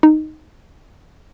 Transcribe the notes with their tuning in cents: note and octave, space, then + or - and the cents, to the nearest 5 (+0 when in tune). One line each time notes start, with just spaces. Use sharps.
D#4 -5